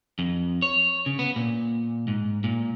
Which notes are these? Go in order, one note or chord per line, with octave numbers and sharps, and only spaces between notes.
F2
C#5
C#3
B3
A#2
G#2
A#2